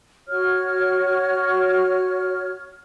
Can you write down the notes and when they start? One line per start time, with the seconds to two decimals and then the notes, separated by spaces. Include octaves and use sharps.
0.28 F#4 C#5 F6